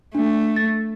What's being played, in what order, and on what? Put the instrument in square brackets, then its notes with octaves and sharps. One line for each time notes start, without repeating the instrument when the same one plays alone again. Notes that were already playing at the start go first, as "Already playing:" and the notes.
[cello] A3 [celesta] D4
[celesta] A6